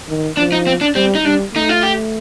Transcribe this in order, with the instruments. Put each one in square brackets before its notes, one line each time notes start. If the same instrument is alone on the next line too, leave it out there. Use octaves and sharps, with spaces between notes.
[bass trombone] D#3
[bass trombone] F3 [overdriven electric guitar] D4
[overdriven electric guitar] D#4
C4
D4
[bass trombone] G3 [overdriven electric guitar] C4
[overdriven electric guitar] D#4
[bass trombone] G3 [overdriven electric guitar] D4
[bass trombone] A3 [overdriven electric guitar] D#4
[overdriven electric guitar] F4
G4